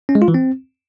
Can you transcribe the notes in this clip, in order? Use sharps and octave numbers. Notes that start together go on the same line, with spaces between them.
C#4
G#3
F4
E3
C4